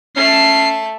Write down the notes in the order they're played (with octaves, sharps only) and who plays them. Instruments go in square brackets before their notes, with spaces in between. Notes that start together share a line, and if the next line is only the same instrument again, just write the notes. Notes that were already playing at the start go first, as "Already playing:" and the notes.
[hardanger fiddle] A3 A5 [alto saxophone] C#4 [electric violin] C7